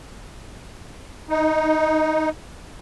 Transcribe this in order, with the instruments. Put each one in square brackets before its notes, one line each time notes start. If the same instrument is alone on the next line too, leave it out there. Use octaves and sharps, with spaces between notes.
[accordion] D#4